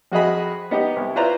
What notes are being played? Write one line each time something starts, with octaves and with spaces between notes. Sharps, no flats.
F2 F#4 G#4 D#5 B5
B3 D#4 G4
C2
E4 F4 B4 C5 D5 A#5